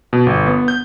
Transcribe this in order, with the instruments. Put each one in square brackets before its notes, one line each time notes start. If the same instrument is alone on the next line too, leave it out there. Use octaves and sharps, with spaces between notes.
[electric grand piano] B2
G1
B3
G6